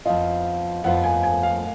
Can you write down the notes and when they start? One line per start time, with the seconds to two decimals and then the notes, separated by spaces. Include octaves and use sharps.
0.05 F2 F3 B3 F4 D#5
0.84 F2 F3 B3 F4 F#5
1.04 G#5
1.23 G#5
1.43 F5